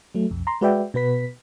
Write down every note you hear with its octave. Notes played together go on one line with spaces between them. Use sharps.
F#3 A3
B1 F2
A#5 C6
G#3 F#4 B4 D5 E5 G5
B2 B3 B4 B6